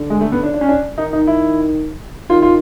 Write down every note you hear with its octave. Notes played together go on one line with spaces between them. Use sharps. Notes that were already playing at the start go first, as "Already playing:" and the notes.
Already playing: D3
G#3
A3
B3
D4
D4
C#4
D4
D#3 D#4
D#4
E4
D#3 F4
F4